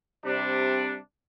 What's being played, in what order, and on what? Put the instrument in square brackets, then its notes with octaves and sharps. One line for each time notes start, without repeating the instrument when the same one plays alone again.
[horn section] C3 G3 D4